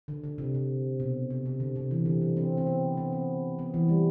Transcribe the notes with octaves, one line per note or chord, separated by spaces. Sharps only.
D3
D3
C3
C3
B2
C3
C3
D3
C3
E3
D3
F#3
C4
C4
B3
B3
C4
B3
E3
G3